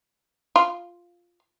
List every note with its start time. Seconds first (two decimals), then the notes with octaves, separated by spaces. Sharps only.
0.56 F4